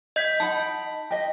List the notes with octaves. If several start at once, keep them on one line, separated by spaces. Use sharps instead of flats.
D#5 G6 B6
D#4 F#5 A5 B5
G4 D#5